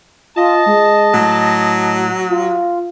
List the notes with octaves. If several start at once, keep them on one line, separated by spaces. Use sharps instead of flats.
F4 D#5 A5
G#3
A2 F#3
F4